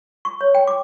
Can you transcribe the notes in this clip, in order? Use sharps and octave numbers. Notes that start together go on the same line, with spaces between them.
C#6
C#5
G5
D6